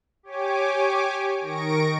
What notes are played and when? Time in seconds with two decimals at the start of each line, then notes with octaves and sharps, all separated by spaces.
0.23 G4 C#5 G#5 D6
1.40 D#3 C#6 A#6 D7